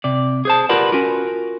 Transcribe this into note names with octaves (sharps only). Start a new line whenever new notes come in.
C3 D5
G#4 C5 A5
F4 G4 A#4 B4 D5 F#5
C#4 F4 F#4 A#4